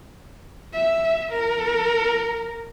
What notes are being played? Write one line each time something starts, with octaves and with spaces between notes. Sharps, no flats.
E5
A#4